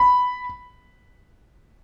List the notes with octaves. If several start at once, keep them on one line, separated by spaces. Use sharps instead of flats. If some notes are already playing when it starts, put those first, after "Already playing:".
Already playing: B5